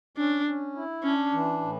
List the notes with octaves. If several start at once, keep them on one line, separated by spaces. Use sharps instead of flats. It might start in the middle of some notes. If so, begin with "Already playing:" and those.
C#4 D4
C#4
E4
C#4 D4
E3
A2